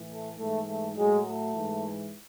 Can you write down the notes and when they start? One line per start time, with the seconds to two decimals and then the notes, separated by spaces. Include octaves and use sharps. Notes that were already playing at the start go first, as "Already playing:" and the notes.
Already playing: A2 E3
0.09 A3
0.38 G#2 E3 A3
0.67 A3
0.96 A2 F#3 G#3
1.25 A3
1.54 G#2 E3